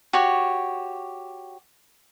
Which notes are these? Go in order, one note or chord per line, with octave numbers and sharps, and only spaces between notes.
F#4 G4 C#5